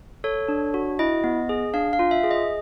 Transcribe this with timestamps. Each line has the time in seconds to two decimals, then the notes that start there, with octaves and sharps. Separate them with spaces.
0.24 A4 C#5
0.48 D4
0.74 F#4
0.99 E4 D#5
1.24 B3
1.49 G#4
1.74 D4 F5
1.93 F5
1.99 F4
2.11 E5
2.24 G#4
2.31 D#5